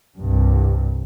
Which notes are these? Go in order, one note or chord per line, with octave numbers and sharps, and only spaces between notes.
C2 G2